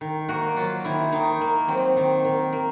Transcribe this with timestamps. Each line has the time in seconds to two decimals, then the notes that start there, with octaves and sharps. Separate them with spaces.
0.01 D#3
0.29 A#3 F#4
0.56 F#3 F4
0.85 D#3 E4
1.12 D#3 D#4
1.41 A#3
1.68 F#3 C4
1.97 D#3
2.25 D#3
2.53 A#3